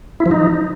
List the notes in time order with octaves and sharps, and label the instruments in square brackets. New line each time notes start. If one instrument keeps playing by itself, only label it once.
[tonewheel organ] E4
F3
D#4